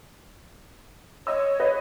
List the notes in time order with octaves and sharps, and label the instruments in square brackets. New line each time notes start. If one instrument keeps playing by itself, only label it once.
[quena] C#5 [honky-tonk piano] D#5 E6
[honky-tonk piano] B4 D#5